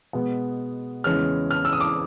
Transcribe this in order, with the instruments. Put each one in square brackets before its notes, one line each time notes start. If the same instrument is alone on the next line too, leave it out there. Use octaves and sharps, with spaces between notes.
[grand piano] B2 G#3 B3
E2 C#3 E3 G#3 C#4 F6
F6
E6
D#6
D6